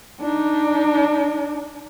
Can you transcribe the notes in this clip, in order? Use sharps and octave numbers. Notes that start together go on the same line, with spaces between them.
D4 D#4